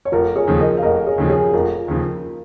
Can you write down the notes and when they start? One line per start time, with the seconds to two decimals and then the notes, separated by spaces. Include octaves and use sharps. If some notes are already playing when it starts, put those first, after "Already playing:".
0.05 C#5
0.12 F1 F4 A#4
0.36 G#4 C#5
0.47 D#2 C#3 F3
0.60 A#4 D#5
0.77 F5
0.83 F1 A#4 D#5
1.06 G#4 C#5
1.18 D#2 C#3 F3
1.29 G#4 C#5
1.53 F1 F4 A#4
1.88 D#2 C#3 F3